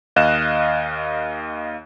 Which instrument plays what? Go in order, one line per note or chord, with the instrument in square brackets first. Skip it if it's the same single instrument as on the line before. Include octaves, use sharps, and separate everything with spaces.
[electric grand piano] D#2 D#5 F5 F#6 E7